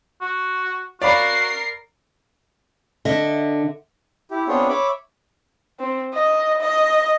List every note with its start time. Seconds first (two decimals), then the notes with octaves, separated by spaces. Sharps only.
0.21 F#4
1.02 F#4 A#4 D5 F5 B5 C7
3.05 D3 D#5 E5 F#5
4.31 E4 G4
4.48 B3 C4 D4 F4 G#4 C#5
4.69 C#5 E5 B5 D6
5.79 C4
6.14 D#5
6.61 D#5